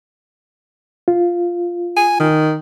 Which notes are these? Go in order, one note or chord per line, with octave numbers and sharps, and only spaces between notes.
F4
G#5
D#3